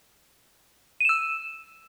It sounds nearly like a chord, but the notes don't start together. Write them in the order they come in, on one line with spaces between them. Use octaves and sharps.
D#7 E7 E6